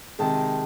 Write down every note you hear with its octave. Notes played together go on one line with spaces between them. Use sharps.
C3 D#3 G#3 A5